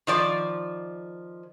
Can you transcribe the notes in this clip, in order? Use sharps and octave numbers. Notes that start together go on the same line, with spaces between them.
D#3 F3 D5